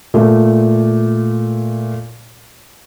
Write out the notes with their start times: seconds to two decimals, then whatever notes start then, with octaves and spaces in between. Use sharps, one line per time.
0.14 A#2 A3